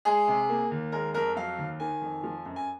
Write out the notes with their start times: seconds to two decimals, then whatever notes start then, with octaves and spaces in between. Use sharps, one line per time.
0.05 G#3 G#4
0.28 C3
0.49 A#3
0.71 D#2
0.92 G#3 A#4
1.14 F2 A#4
1.36 F#3 F5
1.59 D#2
1.80 D#3 G#5
2.02 F2
2.23 F3
2.46 F#2
2.56 G#5